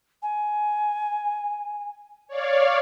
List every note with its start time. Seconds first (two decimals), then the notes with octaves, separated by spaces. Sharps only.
0.23 G#5
2.28 C#5 D5 F5